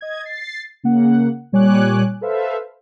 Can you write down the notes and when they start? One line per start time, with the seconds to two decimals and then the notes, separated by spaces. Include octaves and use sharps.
0.01 D#5 G#6
0.23 A6 C7
0.84 C#3 A#3 F#5
1.52 A#2 G3 C#5 G#5 D6 F#6
2.21 A4 B4 C5 E5 F5